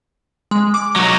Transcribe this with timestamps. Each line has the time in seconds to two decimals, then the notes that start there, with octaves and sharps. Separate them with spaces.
0.51 G#3
0.74 D6
0.96 F#3 D#4